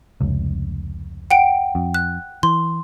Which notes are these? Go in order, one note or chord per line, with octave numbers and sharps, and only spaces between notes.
F1 C#2
F#5 G5 D7
F2
F#6
E3 C6